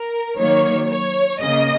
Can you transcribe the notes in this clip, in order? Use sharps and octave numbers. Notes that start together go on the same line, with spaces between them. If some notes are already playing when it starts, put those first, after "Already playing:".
Already playing: A#4
D#3 F#3 A#3 C#5
C#5
C#3 A#3 D#5